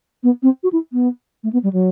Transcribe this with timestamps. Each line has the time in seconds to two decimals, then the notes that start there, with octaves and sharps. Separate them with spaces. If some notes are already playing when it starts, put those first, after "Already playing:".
0.23 B3
0.43 C4
0.63 F#4
0.73 E4
0.93 B3
1.43 A3
1.53 B3
1.63 G3
1.73 F#3